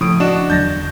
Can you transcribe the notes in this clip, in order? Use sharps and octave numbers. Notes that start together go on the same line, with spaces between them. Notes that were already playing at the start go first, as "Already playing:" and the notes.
C#2 A2 C#3 F3 D#6 D7
D4 F#4 D#5 E7
E2 D3 F#3 G6 A6 A#6